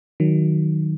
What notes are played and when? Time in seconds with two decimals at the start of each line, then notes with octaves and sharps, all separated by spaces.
0.20 D#3 F#3